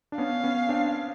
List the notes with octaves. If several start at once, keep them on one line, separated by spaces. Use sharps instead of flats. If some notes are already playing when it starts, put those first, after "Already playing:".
D4
B3 C#4 F5
B3 C#4
C4 D4